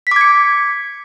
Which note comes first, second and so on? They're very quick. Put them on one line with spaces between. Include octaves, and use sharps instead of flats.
B6 D6 G#6 C#7